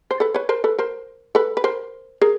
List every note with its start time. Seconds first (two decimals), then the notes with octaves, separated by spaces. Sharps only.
0.11 C5
0.20 A4 B4
0.34 B4 C#5
0.49 A#4 C5
0.64 A4 B4
0.79 A#4 C5
1.35 A4 B4
1.57 B4
1.64 A#4 C5
2.21 G#4 A#4